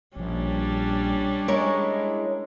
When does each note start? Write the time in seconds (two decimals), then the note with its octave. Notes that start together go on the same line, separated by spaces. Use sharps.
0.17 A#1 G3 C#4 D4
1.48 G#3 E4 A#4 C#5